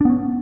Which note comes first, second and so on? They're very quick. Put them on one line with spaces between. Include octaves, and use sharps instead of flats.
D4 B3 C#4